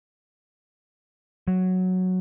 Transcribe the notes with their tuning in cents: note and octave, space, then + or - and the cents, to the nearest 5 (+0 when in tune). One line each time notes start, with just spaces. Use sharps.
F#3 -5